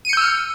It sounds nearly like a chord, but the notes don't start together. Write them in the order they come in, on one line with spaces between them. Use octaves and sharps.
D#7 C#7 G6 E6 F6